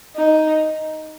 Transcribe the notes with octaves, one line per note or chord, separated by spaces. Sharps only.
D#4